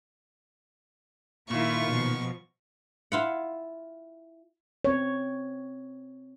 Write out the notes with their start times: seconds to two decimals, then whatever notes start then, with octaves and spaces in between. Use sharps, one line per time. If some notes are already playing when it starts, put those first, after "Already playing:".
1.50 A#2 D#3 A#3 E4 F4 C#6
1.88 B2 F3
3.12 E4 F4 F#5
4.84 C4 C#5